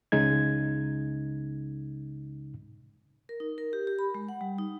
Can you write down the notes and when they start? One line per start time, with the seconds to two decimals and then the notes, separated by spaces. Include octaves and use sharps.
0.12 C#2 C#3 G#3 D#4 G#6
3.29 A#4
3.40 D#4
3.58 A#4
3.73 G4
3.87 G4
3.99 B5
4.14 G#3
4.29 F#5
4.41 G3
4.58 D#4